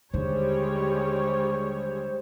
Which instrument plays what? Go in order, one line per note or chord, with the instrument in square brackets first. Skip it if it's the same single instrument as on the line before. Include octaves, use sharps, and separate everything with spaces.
[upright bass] D#2 D3 [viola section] G3 G#3 C#5 [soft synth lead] C5